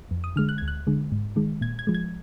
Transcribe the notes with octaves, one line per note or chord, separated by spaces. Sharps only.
F2
D#6
D3 G#3 F6
F#6
D2 G#6
F#6
D3 G#3
G#2
D#3 G#3
A#2 G#6
G#6
F3 G#3
G#6